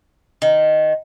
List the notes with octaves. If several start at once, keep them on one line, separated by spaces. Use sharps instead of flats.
D#3